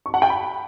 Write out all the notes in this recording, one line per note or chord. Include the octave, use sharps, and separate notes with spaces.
C#6
F#5
G5
B5